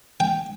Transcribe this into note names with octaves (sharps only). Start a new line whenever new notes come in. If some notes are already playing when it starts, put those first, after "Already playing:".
G5